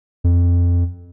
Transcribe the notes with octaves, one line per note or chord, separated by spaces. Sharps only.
F2